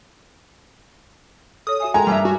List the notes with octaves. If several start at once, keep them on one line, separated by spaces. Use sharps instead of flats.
A4 C#5 D#6
F#4 E5 G#5
G#3 A4 A#4 G5 G#5 A#5
G2 E5
F#4